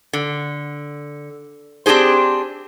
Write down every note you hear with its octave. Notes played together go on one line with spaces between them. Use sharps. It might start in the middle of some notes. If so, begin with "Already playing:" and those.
D3
C4 D4 G4 G#4 C5